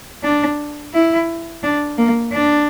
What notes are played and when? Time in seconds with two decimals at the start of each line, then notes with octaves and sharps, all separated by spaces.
0.24 D4
0.94 E4
1.63 D4
1.98 A#3
2.33 D4